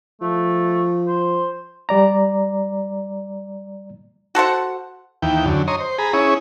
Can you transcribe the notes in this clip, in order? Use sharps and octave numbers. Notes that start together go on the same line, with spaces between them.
F3 A3
C5
G3 D5 A#5
F#4 A4 C5 F#5
D#2 E3 G5
F#2 D3
C#5 D#5 A#5 C6
C5
G#4 A#5 B5
C#4 E4 G#4 C#5